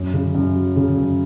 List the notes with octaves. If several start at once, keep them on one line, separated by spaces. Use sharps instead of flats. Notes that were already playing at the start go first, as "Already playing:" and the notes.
Already playing: F#2
C#3
F#2
F#3
C#3
F#2